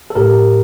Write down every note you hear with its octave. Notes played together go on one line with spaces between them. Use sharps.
A4
A2 G4 A#4